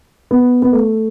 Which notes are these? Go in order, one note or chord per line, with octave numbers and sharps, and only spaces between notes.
B3
B3
A3